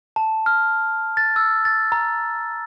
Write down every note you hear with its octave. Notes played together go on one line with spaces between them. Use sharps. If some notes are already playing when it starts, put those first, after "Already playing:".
A5
F6
A6
E6
A6
A#5